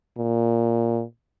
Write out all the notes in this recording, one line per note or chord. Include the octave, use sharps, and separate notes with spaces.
A#2